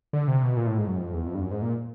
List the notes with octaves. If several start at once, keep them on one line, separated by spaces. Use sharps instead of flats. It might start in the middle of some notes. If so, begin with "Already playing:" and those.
D3
C3
B2
A#2
A2
G#2
F#2
F2
E2
F2
G2
F#2
G#2
A#2